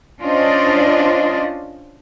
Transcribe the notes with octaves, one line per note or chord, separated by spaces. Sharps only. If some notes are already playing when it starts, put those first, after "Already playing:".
C#4 D4 F4 C5 D5 D#5